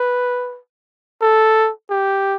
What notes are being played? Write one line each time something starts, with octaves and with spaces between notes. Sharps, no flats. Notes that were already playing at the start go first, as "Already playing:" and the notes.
Already playing: B4
A4
G4